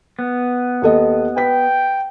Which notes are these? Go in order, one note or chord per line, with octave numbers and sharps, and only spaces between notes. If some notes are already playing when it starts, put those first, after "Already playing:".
B3
D#2 A4 D#5
B4 G5 B6